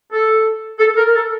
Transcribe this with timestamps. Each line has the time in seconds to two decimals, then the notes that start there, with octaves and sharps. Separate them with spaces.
0.13 A4
0.79 A4
0.98 A#4
1.15 A4